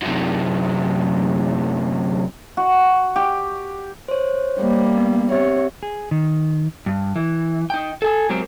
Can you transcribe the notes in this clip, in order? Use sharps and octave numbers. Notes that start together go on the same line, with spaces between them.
F#2 C3
F#4
G4
C5 C#5
G3 A#3
B3
C4 G4 C#5 E5
G#4
D#3
G2
E3
D#4 G5
A4 G#5
F#3 G#3 C4 G4 A#4 C5